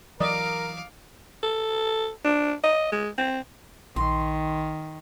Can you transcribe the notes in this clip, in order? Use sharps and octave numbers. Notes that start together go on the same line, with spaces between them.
E3 F#3 A#4 D5 D#5 F5 D6
A4
D4
D#5
G#3
C4
A#1 D#3 C6